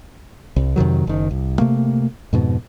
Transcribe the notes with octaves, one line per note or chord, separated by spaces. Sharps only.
C2
F2 C3 D#3 F#3
F#1 D#3
C2
C3 A3 A#3
F2 G#2 B2